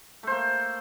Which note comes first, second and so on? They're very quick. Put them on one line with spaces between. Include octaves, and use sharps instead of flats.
A3 C5 A#3